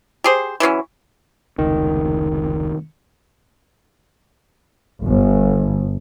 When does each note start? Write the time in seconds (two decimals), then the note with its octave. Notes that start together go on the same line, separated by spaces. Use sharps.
0.24 G4 G#4 C5
0.60 E3 F#3 C4 C#4
1.58 F1 C#2 D#3
5.03 G1